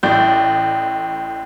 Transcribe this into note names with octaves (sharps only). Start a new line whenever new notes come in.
A1 A2 D5 G6